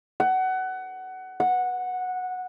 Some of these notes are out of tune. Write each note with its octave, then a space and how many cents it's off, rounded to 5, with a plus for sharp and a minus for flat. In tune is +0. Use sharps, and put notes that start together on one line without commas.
F#5 +20
F#5 -10